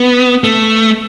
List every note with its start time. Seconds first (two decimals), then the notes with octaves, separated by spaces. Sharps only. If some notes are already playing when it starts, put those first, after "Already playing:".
Already playing: B3
0.44 A3